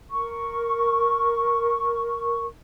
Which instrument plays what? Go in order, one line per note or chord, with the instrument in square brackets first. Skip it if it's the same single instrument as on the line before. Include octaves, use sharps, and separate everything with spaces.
[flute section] A#4 C#6